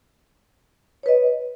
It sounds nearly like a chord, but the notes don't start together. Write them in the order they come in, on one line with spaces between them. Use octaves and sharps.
C#5 B4 D#5